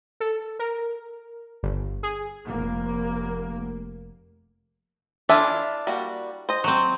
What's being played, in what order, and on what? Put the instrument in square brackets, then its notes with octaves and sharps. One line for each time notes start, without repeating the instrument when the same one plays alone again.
[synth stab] A4
A#4
G1
G#4
[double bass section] F1 A#3
[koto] D4 E4 F4 [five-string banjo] A4 E5 G#5
[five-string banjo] G3 A#3 F#4
C5 D#5
[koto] F#3 C4